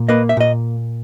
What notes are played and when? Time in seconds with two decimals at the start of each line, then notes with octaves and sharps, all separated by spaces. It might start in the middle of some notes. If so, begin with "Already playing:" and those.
Already playing: A#2
0.08 A#3 B4 D#5
0.29 E5
0.37 A#2 D#5